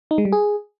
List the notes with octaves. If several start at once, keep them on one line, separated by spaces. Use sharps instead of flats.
D#4
G#3
G3
G#4